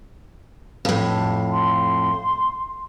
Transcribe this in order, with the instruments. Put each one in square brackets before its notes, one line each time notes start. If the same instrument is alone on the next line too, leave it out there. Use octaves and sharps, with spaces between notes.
[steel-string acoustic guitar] F2 A2
[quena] C6